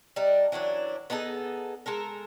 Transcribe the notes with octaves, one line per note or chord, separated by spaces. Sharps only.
G3 D4 D#4
E3 F#3 C#4 D4
B3 D#4 G#4 A4
G#3 A4 A#4